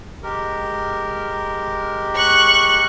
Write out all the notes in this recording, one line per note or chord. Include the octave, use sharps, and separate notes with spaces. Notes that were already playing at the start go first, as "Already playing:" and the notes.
G#3 G4 A#4
C#6 F#6